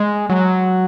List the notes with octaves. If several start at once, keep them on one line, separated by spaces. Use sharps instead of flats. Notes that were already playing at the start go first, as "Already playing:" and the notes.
Already playing: G#3
F#3